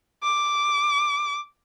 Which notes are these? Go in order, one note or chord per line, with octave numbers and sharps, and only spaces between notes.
D6